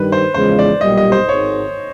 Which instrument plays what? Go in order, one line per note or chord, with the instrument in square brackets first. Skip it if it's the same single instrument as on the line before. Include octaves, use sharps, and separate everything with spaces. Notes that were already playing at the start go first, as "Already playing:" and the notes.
Already playing: [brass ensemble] G2 D#3 G3 [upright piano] B4
[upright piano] C5
[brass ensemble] E2 C#3 F3 G#3 [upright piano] C5
[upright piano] D5
[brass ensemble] B1 A#2 G3 [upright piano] D#5
[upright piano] D#5
C5
[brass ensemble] G#1 G#2 D#3 [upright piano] C#5